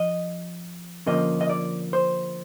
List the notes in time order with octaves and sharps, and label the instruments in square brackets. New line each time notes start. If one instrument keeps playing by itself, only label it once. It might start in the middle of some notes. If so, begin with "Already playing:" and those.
Already playing: [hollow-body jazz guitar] F3 D#5
D3 F3 A#3 C#4 D#5
D#5
D5
C5